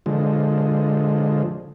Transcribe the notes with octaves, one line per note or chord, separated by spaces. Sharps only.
D3 F3 G#3